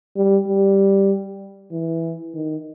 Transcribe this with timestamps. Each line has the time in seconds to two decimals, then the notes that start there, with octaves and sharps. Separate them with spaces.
0.16 G3
0.47 G3
1.72 E3
2.34 D#3